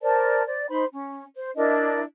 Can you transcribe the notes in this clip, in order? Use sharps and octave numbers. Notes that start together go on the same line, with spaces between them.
A#4 C5 D5 A5
C5 D5
D#4 C5 B5 C6
C#4
C5
D4 E4 A#4 D#5